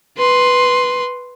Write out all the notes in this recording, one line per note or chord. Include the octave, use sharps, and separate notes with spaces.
B4 C6